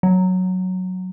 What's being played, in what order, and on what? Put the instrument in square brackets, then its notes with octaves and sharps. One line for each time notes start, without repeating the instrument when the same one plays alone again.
[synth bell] F#3